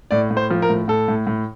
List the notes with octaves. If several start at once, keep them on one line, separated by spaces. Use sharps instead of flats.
A2 D5
A2
C5
F3
A#4
A2
A2 A4
A2
A2